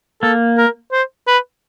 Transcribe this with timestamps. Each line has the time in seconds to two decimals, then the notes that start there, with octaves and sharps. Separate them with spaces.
0.22 A#3 A4
0.57 A#4
0.92 C5
1.27 B4